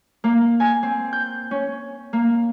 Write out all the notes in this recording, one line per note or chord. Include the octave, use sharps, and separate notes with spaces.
A#3
G#5
C4
G6
C#4
A#3